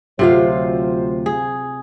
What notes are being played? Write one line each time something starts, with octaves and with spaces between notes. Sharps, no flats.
D2 C3 F#3 F4 C5 F5
G#4